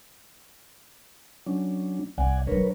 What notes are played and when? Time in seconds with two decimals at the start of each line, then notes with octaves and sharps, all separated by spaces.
1.46 F#3 C#4 D4
2.18 C2 D5 F#5 G#5
2.47 F#3 D4 A#4 B4 C#5